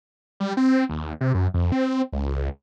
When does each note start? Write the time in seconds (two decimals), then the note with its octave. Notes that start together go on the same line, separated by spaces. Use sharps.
0.40 G3
0.57 C4
0.90 D#2
1.21 C3
1.34 F#2
1.54 F2
1.72 C4
2.13 C#2